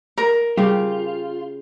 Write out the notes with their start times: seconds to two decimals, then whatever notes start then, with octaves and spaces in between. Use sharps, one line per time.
0.18 A#4
0.57 C#3 G3 F4 G4